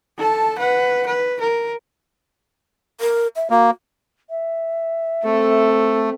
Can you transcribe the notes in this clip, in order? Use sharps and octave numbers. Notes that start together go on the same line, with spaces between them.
A4 A5
B4 F#5
B4
A#4
A#4
E5
A#3 F#4
E5
A3 C4 A4